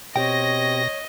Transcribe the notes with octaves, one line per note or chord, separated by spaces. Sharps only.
B2 C4 G4 C#5 D#5 G5 A#6